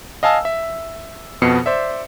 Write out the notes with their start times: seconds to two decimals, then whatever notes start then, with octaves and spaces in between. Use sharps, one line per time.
0.23 D#5 F5 G#5 A5 E6
0.45 E5
1.42 F2 B2 B3 C7 C#7
1.66 C5 D5 E5